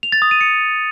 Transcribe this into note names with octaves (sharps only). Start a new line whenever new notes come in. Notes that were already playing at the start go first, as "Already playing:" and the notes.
F7
A6
D#6
D#7
C#7